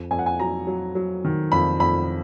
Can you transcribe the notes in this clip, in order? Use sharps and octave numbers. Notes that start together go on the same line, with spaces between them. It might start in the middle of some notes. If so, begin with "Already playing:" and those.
Already playing: F2
F2 G#5
F#5
G#5
F#3 A#5
F#3
F#3
D#3
F2 B5
F2 B5